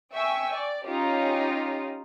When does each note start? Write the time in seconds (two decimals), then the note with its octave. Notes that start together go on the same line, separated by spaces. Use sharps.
0.12 E5 G5 G#5 C#6 E6
0.52 D5
0.86 C#4 D#4 F4 G4